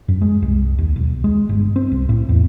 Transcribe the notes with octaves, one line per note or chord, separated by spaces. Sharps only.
F#2
G#3
C2
D#2
B1
G#3
G1
C4
C2
A2
E2